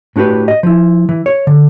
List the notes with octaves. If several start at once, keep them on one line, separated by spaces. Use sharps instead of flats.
A2 D4 F#4 G4 B4
D#5
F3 E4
E3
C#5
D3